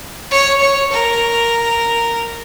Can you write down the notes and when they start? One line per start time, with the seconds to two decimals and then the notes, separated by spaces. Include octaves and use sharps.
0.31 C#5
0.62 C#5
0.91 A#4